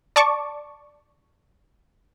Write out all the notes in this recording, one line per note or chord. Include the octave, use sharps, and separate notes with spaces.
D5 A5 C#6 D6